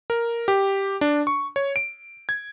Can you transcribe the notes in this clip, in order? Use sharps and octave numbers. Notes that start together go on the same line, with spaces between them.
A#4
G4
D4
C#6
C#5
D7
G#6